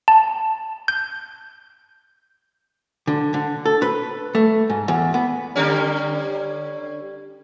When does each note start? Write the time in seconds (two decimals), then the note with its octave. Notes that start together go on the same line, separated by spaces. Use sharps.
0.08 A5
0.88 G6
3.07 D3
3.34 D3
3.65 A4
3.82 B4
4.35 A3
4.70 G#2
4.88 E2
5.14 B3
5.55 D3 G3 C#4